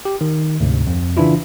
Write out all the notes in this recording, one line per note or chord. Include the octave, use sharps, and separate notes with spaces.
G4
D#3
D2 G#2 C3
F2
C#3 E3 D4 E4 F4